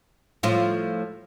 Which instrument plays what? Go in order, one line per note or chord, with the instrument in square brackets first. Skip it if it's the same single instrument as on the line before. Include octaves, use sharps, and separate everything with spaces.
[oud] A2 F3 F4